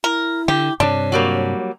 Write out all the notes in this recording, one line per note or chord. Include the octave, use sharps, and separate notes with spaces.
E4 A#4
D3 G4
G2 C3 D4 C#5
F#3 G3 A#3